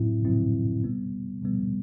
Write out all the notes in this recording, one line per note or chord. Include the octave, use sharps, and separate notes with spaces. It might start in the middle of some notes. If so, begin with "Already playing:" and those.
Already playing: A2 F#3 C4 E4
A2 F#3 C4 E4
B2 G3 B3
B2 G3 B3